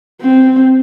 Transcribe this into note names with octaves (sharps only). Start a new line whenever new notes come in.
C4